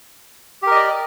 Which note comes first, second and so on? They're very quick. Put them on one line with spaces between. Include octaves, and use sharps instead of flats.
G4 A#4 D#5 D5